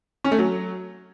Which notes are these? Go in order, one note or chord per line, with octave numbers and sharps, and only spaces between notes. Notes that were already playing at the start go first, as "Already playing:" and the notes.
C#4
A3
F#3